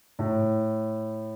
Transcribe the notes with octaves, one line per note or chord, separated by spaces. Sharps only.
A2